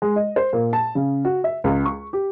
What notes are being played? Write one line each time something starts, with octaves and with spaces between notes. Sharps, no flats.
G#3
D#5
C5
A#2
A5
C#3
F#4
E5
C#2
C#6
G4